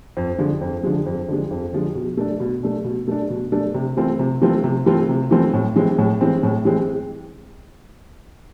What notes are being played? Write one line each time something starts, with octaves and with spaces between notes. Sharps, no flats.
F2
D3 F3 G#3
F2
D3 F3 G#3
F2
D3 F3 G#3
F2
D3 F3 G#3
B2
A3 D4
B2
A3 D4
B2
A3 D4
B2
A3 D4
C3
E3 A3 C4 F4
C3
E3 A3 C4 F4
C3
E3 A3 C4 F4
C3
E3 A3 C4 F4
A2
E3 G#3 C4
A2
E3 G#3 C4
A2
E3 G#3 C4